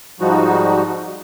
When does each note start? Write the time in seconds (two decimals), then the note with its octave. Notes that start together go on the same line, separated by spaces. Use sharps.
0.20 G#2 F3 G3 D#4 F#4